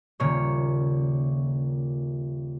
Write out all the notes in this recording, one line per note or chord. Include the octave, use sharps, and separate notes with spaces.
D#1 C#3 A#3 C#5